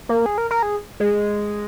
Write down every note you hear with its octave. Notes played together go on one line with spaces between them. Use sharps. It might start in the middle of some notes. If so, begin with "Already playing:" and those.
A#3
G#4
A#4
A#4
G#4
G#3